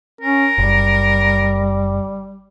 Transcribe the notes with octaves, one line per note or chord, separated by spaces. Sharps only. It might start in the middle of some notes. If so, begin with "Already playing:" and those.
C#4 A#4
F#1 G3